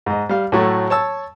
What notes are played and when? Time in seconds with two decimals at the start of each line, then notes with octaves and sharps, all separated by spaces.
0.06 G#2 D#5
0.29 G3 F5
0.52 A2 F#3 A3
0.90 C#5 A5 E6